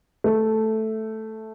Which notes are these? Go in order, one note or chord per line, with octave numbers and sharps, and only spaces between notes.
A3